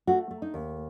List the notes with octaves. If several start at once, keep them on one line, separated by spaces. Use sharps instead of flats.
A3 F#4
A3
D#4
D#2